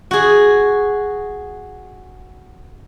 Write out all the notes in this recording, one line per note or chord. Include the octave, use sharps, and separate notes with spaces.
F#4 G#4